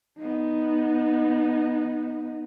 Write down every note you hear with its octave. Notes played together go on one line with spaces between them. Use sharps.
B3 D#4